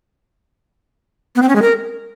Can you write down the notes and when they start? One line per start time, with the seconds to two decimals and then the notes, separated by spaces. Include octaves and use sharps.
1.36 B3
1.42 C4
1.49 C#4
1.56 G#3
1.62 A#4